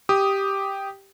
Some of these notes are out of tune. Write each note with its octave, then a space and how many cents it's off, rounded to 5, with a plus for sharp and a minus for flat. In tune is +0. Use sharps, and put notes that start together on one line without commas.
G4 +0 D#6 +0